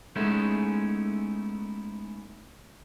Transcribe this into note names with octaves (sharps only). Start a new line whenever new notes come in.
G#3 A3 B3 C#4 D#4 E4